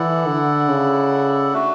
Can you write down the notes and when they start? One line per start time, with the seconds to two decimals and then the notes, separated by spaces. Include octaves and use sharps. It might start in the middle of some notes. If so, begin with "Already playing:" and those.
Already playing: E3 E4 A4 D5 F#5
0.27 D3
0.69 C#3
1.53 A3 D4 F#4